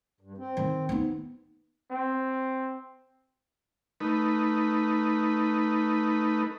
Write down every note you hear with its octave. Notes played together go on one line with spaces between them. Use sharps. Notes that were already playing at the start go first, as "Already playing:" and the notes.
G2
C4
D#3
B3 D#4
C4
A3 D#4 B4